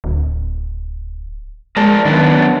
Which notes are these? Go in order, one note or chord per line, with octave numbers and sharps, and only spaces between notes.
D1
G#3 A#4 D5 A5
F#2 D#3 B3 D4